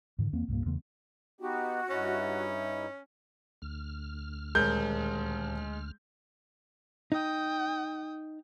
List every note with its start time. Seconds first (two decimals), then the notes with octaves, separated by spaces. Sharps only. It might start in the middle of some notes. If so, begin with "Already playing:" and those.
0.19 G#2 D3 D#3
0.33 E2 A#3 C4
0.48 C2 G2 A#2 A#3
0.66 E2 C#3 A3 B3
1.41 B3 D#4 F#4 G4
1.90 G2 C#4 D#4 E4
3.62 D2 F6
4.55 D#1 G#3 A#4 G6
7.12 D#4 G5 D#6